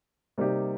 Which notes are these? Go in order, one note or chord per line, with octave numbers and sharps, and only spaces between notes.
C3 G3 A#3 D#4 G4